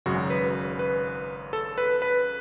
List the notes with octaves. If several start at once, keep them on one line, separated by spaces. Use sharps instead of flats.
G#1 F#2 C#3 F#3 F#4
B4
B4
A4
B4
B4